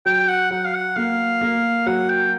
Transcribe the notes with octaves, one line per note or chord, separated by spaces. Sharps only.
F#3 G5
F#5
F#3 F#5
F5
F#5
A#3 F5
A#3
F#3 F#5
G5